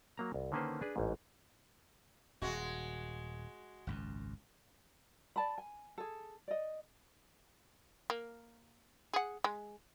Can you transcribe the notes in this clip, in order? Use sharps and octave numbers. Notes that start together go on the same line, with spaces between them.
F#3 A#3 A#5
C2
D3 D#3 A#3 C#4 B4 C5
D4 G#4 B4
A1 G#2
D#1 G#3 F#4
G#1 C#2 F#2
D5 A5 B5
G#5
G#4 A4
D5 D#5
A#3
G#4 F#5
G#3